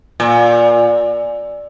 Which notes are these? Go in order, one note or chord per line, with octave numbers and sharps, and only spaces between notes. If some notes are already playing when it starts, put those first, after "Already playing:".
A#2